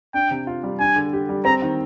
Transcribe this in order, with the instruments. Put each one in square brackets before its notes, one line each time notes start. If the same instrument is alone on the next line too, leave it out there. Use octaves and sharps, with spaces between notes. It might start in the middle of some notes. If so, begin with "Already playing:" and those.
[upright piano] D4 [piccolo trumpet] G5
[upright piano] C3
F4
G3
[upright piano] D4 [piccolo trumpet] G#5
[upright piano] D3
G4
G3
[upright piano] C4 [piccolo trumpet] A#5
[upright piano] D#3